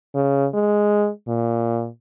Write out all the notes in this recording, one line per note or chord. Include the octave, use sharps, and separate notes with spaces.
C#3
G#3
A#2